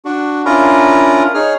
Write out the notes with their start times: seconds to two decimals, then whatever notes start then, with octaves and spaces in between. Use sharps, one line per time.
0.05 D4 F#4
0.45 C#4 D4 E4 F4 A#4 A#5
1.34 D#4 G#4 C#5 F6